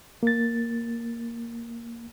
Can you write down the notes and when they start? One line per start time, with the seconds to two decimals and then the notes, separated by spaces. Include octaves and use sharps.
0.23 A#3 A6